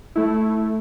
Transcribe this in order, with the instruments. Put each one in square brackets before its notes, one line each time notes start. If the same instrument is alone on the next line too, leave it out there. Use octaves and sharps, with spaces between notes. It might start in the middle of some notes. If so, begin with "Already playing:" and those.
[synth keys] A3 E4